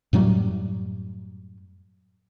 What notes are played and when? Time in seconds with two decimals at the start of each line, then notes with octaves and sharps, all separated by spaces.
0.13 F#2 A2 F#3 G3